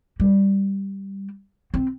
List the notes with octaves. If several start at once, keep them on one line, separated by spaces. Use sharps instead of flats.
G3
C4